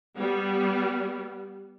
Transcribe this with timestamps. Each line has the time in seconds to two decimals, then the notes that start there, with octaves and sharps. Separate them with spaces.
0.16 G3 B3